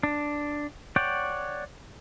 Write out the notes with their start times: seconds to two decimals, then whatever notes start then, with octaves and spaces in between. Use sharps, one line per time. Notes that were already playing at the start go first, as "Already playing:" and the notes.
0.03 D4
0.96 C#5 D5 F#5 G5